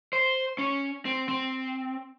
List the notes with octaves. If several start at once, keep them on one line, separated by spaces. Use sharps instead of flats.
C5
C#4
C4
C4